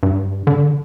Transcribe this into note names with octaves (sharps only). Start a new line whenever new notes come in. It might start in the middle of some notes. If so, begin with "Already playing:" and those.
G2
D3